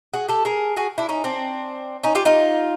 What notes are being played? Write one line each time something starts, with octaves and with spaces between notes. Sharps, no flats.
F#4 G#4
G4 A4
G#4 A#4
F#4 G#4
D4 E4
C#4 D#4
C4 D4
C#4 D#4
F4 G4
D#4 F4